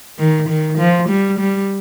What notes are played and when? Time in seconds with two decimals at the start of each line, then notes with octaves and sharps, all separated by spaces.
0.19 D#3
0.49 D#3
0.79 F3
1.09 G3
1.39 G3